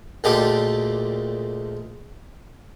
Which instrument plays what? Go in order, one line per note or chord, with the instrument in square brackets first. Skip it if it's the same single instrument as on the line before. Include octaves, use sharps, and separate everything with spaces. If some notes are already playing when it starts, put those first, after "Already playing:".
[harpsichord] D2 A#2 G#3 G4 A4